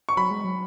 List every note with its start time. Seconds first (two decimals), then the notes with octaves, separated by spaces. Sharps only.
0.09 C#6
0.17 F#3 B5
0.31 G#3
0.44 F#3